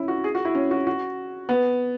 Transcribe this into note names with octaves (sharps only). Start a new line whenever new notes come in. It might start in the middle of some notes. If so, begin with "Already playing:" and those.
Already playing: C#4 E4
F#4
G#4
F#4
E4
C#4
F#4
F#4
B3